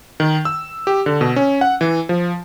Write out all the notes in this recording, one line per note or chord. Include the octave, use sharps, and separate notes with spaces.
D#3
E6
G4
D3
B2
C#4
F#5
E3
F3